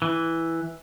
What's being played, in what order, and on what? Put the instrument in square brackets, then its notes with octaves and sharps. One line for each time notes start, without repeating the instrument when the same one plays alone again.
[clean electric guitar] E3